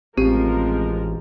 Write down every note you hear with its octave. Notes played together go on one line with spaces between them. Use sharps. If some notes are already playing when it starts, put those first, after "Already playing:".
A1 F3 G#3 C4 G4 A#4